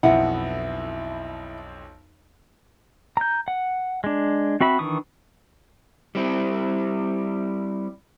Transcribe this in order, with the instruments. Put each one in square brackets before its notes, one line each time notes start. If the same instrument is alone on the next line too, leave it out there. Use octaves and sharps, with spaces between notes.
[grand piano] B1 F2 B2 [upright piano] E4 [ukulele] B4 F#5
[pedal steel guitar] A#5 G6
F#5
G#3 D4
C4 F#4 E5 B5
D#3 E3 D4 C#6 D#6
[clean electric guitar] G3 C4 E4